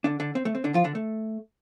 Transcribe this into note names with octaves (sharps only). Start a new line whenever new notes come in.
D3 D4
D3 D4
C4
A3
C4
D3 D4
F3 F4
D3 D4
A3